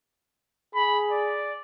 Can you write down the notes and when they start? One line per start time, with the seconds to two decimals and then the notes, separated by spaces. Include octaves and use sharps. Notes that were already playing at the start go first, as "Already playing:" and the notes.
0.75 G#4 B5
1.11 D5